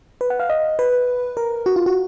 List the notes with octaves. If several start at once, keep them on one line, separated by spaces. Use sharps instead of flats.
B4
F#5
F5
D#5
B4
A#4
F#4
F4
F#4